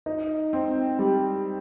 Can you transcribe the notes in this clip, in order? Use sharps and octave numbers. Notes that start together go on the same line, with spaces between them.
D#4
C4
G3